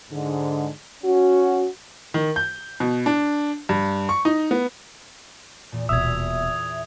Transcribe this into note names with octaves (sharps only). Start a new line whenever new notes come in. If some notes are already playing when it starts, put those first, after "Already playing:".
G#2 D3
C#4 F#4
D#3
G6
B2
D4
G2
C#6
D#4
B3
E2 A#2
D#1 B2 E5 D#6 G#6